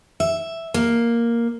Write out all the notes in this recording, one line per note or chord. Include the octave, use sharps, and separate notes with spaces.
E5
A#3